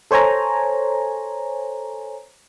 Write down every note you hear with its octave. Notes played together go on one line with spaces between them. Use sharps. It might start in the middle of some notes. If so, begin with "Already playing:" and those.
A4 C5 C#5 G#5 A#5